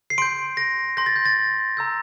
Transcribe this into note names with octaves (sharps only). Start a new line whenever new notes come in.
C7
C6 G6 D7
A#6
C6 G6 A#6
A6
G6
A6
A#5 E6 G6